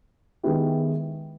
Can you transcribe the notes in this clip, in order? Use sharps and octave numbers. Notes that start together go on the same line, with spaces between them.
D#3 G#3 B3 E4 G4